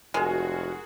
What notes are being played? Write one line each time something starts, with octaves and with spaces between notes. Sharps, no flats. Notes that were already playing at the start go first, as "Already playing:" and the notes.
F1 G#3 F#4 G#4 A#4